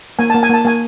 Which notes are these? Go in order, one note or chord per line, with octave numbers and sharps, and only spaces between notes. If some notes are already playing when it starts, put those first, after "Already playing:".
A#3 G#5
A#3 A5
G#5
A#3 A5
A#3 G#5